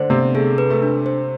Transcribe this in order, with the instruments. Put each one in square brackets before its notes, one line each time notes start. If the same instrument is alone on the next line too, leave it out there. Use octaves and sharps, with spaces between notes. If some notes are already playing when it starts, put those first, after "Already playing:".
Already playing: [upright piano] D3 D4 [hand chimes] C5
[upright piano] C3 C4 [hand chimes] B3
[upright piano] A3 [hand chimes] G#4
[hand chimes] B4
[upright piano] A3
[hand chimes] D4
C5